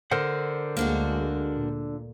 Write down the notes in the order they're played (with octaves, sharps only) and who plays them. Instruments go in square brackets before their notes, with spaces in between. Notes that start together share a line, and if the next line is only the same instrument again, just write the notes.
[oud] D3 [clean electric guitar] A#4 C5 F#5
[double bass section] D2 G#3 [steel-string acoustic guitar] A#3 D4 F#4
[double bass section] A#2